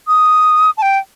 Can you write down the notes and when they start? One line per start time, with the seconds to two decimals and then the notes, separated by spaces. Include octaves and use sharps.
0.08 D#6
0.77 A5
0.82 G5